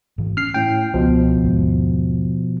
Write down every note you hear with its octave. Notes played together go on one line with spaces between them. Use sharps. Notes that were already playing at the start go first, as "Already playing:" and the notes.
G#2 E3
C#4 F6 C7
A2 G5
C#2 B2 F3
D#2 G#2